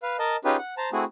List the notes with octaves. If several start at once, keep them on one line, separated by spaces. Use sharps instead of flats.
B4 F5
A#4 D#5 A5
C#4 D#4 F4 G4 G#4 B4
F#5
C5 A5 A#5
A3 C4 E4 F#4 G#4